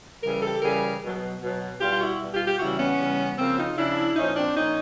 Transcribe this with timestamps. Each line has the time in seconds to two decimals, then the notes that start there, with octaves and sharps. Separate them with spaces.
0.23 C#3 E3 G3 G#4 A#4
0.43 G4 A4
0.63 C#3 E3 G3 G#4 A#4
1.02 B2 F#3
1.41 B2 F#3
1.81 B2 G3 F4 G4
1.91 F4
2.00 E4 F#4
2.20 B2 G3
2.33 F4 G4
2.46 F4 G4
2.59 C#3 E3 G3 E4 F#4
2.79 B3 C#4
2.98 C#3 E3 G3
3.38 C#3 F3 A#3 C4
3.57 D#4 F4
3.77 C#3 F3 D4 E4
4.16 A#2 F3 C#4 D#4
4.36 C4 D4
4.56 A#2 F3 C#4 D#4